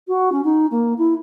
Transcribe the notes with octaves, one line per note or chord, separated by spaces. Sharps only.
F#4
C#4
D#4
A#3
E4